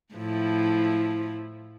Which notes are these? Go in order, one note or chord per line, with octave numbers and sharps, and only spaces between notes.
A2 F3 E4